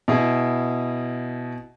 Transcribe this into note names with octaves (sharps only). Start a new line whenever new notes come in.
B2 E4 G#4